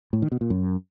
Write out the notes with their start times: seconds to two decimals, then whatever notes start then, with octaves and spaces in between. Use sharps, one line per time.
0.13 A2
0.22 D#3
0.32 B2
0.41 A#2
0.50 F#2